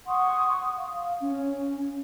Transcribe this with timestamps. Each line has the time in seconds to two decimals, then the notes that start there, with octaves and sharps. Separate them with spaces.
0.07 F#5 C6 C#6 D#6
0.76 F5
1.22 C#4